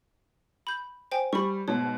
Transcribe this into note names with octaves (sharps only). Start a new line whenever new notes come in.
B5 G6
C5 G5 G#5
G3 B5 C#6
G#2 B2 C#5